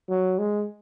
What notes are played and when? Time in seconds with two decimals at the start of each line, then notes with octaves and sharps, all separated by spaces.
0.09 F#3
0.39 G#3